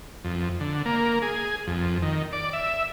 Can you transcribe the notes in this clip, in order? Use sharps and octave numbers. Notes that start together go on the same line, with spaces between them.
F2
D3
A#3
G#4
F2
D#3
D5
E5